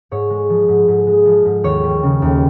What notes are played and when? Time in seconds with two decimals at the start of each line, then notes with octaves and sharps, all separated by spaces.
0.11 G#2 C#5
0.30 G#3
0.50 F3
0.68 G#2
0.88 G#2
1.07 G#3
1.25 F3
1.45 G#2
1.64 D#2 C#5
1.83 G3
2.03 C#3
2.22 D#2